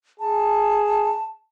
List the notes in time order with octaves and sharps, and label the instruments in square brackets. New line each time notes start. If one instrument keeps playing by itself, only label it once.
[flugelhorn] G#4 [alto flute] A5